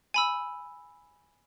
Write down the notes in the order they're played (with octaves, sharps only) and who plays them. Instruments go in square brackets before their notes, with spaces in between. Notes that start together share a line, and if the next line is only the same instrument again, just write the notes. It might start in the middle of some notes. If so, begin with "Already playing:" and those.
[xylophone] G#5 B5 E6